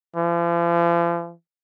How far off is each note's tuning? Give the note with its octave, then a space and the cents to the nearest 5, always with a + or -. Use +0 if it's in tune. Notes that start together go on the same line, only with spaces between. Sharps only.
F3 -40